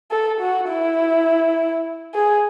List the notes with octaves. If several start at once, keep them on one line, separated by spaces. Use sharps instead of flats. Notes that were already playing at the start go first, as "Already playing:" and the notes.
A4
F#4
E4
G#4